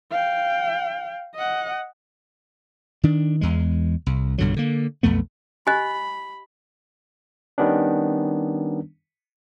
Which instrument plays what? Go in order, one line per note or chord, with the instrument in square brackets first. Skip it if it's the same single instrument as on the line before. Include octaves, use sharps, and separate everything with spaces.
[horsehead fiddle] F5 G5
D#5 F#5
[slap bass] D#3 D4
E2 G#3
C2
B1 G2 D3 F#3
D3 A#3
B1 F2 A3 B3
[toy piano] G4 D#5 [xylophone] G#5 F#6 [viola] B5
[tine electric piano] D#3 G3 B3 C#4 D4